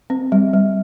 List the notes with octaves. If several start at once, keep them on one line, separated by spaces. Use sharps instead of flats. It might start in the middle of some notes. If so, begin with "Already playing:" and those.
C4
G3
G3